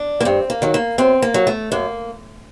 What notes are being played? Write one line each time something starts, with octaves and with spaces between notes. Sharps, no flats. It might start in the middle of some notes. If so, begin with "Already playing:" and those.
Already playing: D4
A#3
G2 C4
A#3
D#3 F#3
A#3
F#2 C4
A#3
F#3
A3
F#2 A#3